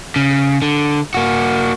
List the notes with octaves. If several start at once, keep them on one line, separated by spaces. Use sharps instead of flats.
C#3
D3
A#3 F#4